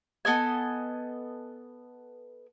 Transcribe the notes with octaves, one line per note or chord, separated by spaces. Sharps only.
B3 A4 D#5 G#5